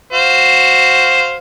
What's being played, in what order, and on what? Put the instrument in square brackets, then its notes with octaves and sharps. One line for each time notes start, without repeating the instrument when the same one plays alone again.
[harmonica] F#4 C5 F5